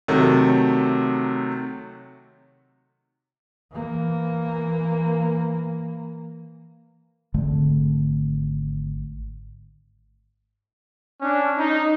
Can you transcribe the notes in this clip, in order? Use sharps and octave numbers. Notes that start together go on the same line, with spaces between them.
C3 D#3 F#3 A3
E3 A#3
G#1 D3 A3
C#4 D4
D#4